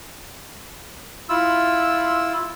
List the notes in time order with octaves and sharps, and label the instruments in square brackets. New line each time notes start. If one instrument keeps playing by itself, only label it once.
[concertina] E4 F4 E6